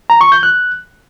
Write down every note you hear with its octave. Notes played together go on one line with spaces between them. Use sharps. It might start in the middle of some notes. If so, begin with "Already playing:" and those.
A#5
C#6
G6
F#6